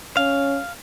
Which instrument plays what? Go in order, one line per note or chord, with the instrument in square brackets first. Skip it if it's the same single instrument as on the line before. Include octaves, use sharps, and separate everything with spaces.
[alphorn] C#4 [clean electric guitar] F5